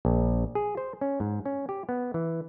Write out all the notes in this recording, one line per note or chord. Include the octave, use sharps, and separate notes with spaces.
A#1
G#4
C5
C#4
G#2
C#4
G4
B3
E3